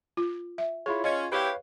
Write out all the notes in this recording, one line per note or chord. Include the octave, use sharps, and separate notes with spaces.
F4
E5
E4 F4 G#4 C#5
C#4 F4 D#5 G#6
C4 E4 G4 B4 C#5 F5